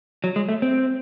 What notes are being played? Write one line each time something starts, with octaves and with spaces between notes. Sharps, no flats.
F#3
G#3
A3
C4